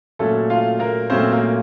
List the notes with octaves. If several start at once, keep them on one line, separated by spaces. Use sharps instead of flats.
A#2 F#3 A3 C#4 A4
F4 F5
A#3 A#4
A#2 F#3 A3 C4 C#4 C5
A#3 A#4